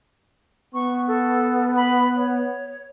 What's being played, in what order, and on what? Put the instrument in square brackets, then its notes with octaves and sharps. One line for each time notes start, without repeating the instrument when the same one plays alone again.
[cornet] B3 [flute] C#6
[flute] A4
B5
C#5